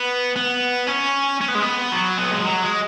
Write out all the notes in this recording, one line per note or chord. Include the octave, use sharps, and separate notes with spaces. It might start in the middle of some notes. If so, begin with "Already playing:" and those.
Already playing: B3
B3
C#4
C#4
B3
G#3
B3
F#3
B3
G#3
F#3
G#3